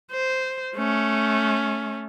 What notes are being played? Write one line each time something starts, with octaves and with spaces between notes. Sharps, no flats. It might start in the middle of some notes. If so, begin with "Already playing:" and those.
C5
A3 C#4